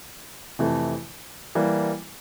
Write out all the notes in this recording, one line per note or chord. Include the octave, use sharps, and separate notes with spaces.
F2 C3 E3 A3
E3 G3 A#3